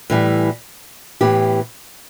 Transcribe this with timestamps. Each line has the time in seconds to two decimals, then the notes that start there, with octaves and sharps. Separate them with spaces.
0.10 A2 E3 G3
1.21 A2 E3 B3 E4 G4